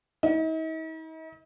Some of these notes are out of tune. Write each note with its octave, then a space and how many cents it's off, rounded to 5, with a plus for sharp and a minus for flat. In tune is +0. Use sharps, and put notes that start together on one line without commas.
D#4 +45